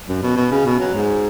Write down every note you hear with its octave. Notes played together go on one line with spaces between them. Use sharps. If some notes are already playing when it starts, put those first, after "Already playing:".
F#2
B2
B2
C#3
B2
F#3
G#2